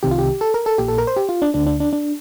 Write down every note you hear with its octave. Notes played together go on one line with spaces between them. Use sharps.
C2 C3 D#3 G4
F4
G4
A4
A#4
A4
A#1 A#2 G4
A4
A#4
C5
G4
F4
D4
D2 D3 D4
D4
D4
D4